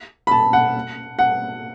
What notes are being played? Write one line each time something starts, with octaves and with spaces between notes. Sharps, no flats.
B5
A5
F#5
F#5